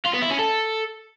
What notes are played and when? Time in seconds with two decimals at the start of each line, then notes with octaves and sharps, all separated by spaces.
0.05 F4
0.13 B3
0.22 E4
0.30 C#4
0.39 A4